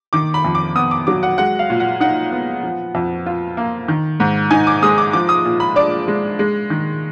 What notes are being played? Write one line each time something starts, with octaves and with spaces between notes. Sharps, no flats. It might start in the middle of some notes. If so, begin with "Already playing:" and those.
D#3 D6
B5
F2
D6
B3 D#6
D6
F#3 D6
F#5
G#3 F#5
F5
A#2
F#5
D#4 F#5
B3
F3
F2
F4
A#3
D#3
G#2
D#4 G#5
D6
G#3 D#6
D6
F3 D6
D#6
A#2
B5
D4 D6
G#3
G#3
D#3